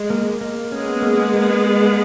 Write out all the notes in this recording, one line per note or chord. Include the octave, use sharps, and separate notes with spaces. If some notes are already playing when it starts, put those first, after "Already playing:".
Already playing: G#3
A#3
A#3
G#3 B3 C#4
A#3
A#3